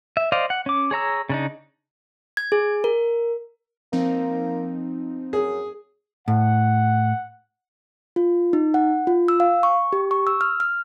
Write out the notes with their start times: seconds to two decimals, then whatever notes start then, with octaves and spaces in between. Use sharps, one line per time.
0.17 E5
0.32 C5 D5 D#5 F5
0.50 F#5
0.66 C#4 D6
0.91 G#4 C#5 A#5 E6
1.29 C#3 D4 D#4
2.37 G#6
2.52 G#4
2.84 A#4
3.93 F3 A#3 C4 D#4
5.33 F#2 G#4
6.28 A2 F#5
8.16 F4
8.53 D#4
8.74 F#5
9.07 F4
9.28 E6
9.40 F5
9.63 C#6
9.93 G4
10.11 C#6
10.27 E6
10.41 F6
10.60 F6